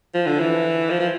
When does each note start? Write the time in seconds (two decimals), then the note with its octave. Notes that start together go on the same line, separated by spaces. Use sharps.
0.14 F3
0.27 D3
0.40 E3
0.90 F3
1.00 F3